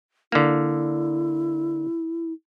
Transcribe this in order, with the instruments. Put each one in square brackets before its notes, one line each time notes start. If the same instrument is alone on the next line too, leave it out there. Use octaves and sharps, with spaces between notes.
[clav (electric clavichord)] D3 A#3 [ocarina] E4